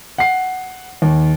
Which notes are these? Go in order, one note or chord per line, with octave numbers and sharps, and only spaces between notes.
F#5 C7
D#2